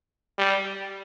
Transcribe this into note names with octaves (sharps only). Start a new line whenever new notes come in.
G3